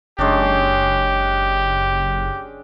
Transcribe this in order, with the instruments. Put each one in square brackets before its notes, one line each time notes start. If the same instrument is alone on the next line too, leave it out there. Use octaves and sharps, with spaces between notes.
[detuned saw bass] F#1 [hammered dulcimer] G#3 C#4 D4 [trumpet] G4